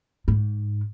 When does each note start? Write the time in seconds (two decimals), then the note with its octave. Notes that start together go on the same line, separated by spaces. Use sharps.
0.28 G#2